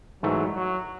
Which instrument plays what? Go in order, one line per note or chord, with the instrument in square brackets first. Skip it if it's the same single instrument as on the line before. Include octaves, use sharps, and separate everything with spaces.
[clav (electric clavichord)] G#2 E3 A3 [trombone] F#3
[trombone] F#3